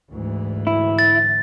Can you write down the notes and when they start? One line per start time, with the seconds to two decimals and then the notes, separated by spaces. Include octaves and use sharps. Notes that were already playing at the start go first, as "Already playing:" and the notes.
0.11 D2 G#2 E3
0.67 E4
0.99 A6